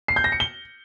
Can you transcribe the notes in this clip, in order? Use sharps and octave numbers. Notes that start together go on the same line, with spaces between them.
C7
G6
A#6
C#7
G7